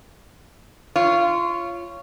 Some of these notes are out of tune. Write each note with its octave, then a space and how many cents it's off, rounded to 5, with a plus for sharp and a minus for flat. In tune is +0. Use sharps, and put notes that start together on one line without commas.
F4 -20 C#5 +0